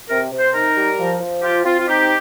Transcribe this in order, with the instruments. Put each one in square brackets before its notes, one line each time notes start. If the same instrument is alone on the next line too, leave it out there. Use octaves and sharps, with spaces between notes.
[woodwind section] C3 A#4
C3
C5
D#4 A#4
G3
F3
F3
F4 G4
C4 F4
F4
D#4 G4